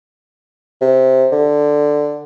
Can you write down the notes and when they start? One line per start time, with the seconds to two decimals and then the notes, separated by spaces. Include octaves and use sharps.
0.81 C3
1.32 D3